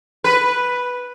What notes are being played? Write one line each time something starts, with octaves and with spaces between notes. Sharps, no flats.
B4